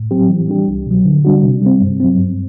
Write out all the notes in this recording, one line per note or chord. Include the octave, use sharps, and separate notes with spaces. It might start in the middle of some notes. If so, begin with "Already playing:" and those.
Already playing: A2
F#3 C4 G4
E3
G3 D4 G4
C2
B2 F#3
D3
G3 D4 F#4
C3
G3 C4
G2
F#3 C4
G2